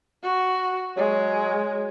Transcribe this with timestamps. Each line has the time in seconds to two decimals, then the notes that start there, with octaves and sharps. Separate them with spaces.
0.23 F#4
0.97 F#3 G#3